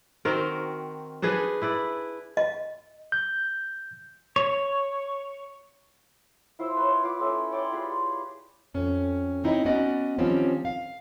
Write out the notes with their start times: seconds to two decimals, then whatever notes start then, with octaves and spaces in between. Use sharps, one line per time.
0.25 D#3 C4 F#4 A#4
1.22 D4 D#4 G#4 B4
1.62 E4 B4 D5
2.37 D#5
3.12 G6
4.36 C#5
6.59 E4 F4 C5 E6
6.77 B4 C#5
7.03 E4 F4 D6
7.20 C#4 A4 E5 G#5
7.51 C#5 D5 G5 C6
7.72 F4 G4 G#4 B4
8.74 F2 C#4
9.44 C4 D#4 E4 C#5 D#5
9.65 B3 C#4 F#4 D5 D#5
10.18 D#3 F3 G3 C4 C#4
10.65 F5